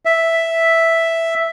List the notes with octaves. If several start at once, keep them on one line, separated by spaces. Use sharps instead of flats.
E5